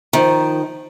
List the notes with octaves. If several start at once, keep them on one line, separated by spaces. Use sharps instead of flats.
D#3 F3